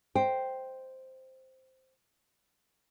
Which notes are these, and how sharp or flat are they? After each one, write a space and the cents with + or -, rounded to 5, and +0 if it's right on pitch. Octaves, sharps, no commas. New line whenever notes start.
C5 +0 D#5 +0 G5 +0